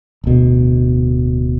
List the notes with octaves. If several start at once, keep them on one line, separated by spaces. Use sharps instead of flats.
D1 B2